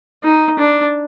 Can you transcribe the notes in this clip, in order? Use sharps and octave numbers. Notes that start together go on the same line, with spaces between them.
D#4
D4